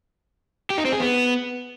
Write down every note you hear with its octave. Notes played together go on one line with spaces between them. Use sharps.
G4
D#4
C4
G#4
B3